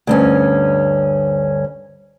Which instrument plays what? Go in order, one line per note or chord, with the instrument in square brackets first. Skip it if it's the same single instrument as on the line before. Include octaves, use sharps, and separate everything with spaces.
[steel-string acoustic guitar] D2 G2 C#4